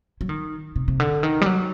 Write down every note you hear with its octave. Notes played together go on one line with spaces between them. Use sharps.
F#3
D#3
C3
C3
D3
D#3
G3
F#3